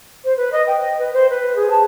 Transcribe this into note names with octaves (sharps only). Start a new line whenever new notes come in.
C5
B4
D#5
G5
D#5
B4
C5
B4
G#4
A5